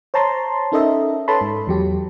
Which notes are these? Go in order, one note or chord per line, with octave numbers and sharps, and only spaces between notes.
C5 C#5 A5 A#5 C6
C#4 D#4 A4 A#4 D#5 E5
A4 B4 C#5 A5 B5 C6
G#2
E2 F#3 G4